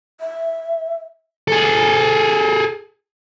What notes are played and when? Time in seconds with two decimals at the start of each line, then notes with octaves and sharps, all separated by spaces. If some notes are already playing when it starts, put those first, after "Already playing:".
0.21 E5
1.48 G#4 A4